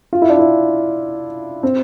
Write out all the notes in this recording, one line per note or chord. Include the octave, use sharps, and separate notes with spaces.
F4
E4
D4
E4
C4